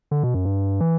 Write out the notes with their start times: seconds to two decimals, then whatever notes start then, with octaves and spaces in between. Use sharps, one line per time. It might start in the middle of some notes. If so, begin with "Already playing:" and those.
0.11 D3
0.23 B2
0.34 F#2
0.45 G2
0.80 E3